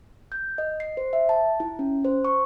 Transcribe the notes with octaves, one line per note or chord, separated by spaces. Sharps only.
G6
D#5
C7
C5
E5
A5
E4
C#4
C5
C#6